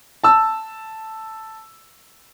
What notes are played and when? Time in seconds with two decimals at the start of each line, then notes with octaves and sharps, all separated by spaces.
0.24 A5 E6